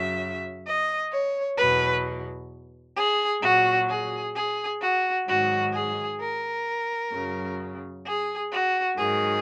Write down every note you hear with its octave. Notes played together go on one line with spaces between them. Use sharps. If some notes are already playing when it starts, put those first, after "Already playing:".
Already playing: F#2 C#3 F#3 E5
D#5
C#5
E2 B2 F#3 B4
G#4
A#2 F#3 F#4
G#4
G#4
F#4
G#2 D#3 F#3 F#4
G#4
A#4
F#2 C#3 F#3
G#4
F#4
G#2 D#3 F#3 G#4